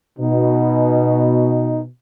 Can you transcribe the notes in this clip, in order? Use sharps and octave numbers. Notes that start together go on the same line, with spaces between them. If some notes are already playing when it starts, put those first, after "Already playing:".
B2 D#4